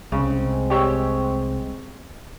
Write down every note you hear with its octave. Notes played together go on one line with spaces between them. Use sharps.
C2 C#3 G#3 C4
G4 C#5 E6